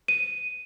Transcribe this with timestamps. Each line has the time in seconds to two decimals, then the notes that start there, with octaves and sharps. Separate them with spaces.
0.08 D#7